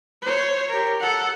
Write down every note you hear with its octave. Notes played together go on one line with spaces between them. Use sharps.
C5 C#5
G4 A#4
A4 F#5